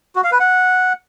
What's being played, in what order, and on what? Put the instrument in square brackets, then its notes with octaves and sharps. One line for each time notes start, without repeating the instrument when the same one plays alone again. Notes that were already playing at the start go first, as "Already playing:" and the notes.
[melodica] F#4
F5
B4
F#5